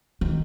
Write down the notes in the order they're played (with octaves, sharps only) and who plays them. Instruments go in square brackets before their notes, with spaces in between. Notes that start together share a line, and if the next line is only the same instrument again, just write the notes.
[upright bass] D#3